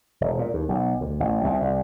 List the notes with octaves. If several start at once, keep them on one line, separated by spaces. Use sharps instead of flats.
E1
A#2
D#2
B1
D2
A1
C2
C2